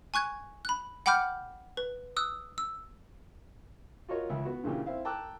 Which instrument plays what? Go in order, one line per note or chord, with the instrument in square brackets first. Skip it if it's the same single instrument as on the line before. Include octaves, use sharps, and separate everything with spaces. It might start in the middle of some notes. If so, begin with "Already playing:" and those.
[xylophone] G#5 C#6 F#6 G#6
B5 F#6
F#5 G5 B5 D6 F6 G6
B4
D#6 E6 F#6
E6
[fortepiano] F4 F#4 A#4 C#5 D#5
C#2 E3 E4
B3 F#4
G2 A#2 C#3 E3 G4
C4 E4 F5
G5 A5 A#5 D6 E6 F#6